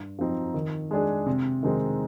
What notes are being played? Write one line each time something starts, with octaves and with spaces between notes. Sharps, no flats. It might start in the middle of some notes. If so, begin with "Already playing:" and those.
Already playing: G2
F3 C4 D#4
D#3
G#3 D4 G#4
C3
D#3 G#3 C4 D#4